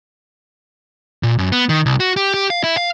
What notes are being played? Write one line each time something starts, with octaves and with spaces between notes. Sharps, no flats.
A#2
F#2
B3
D#3
C2
F#4
G4
G4
F5
E4
F5